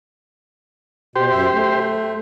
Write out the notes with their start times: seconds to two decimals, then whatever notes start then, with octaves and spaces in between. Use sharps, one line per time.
1.16 B2 G4 C5
1.31 F#2 E5
1.54 A3